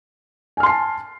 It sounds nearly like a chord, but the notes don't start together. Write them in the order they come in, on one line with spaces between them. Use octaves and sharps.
G#5 F6 C6 C7 A5